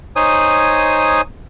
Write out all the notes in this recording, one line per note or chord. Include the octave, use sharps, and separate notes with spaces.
D#4 C5 C#5 G#5 D#6